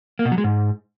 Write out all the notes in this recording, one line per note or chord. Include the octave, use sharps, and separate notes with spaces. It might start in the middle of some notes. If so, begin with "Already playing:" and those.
A#3
B2
F#3
G#3
G#2